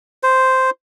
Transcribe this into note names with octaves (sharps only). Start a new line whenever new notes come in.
C5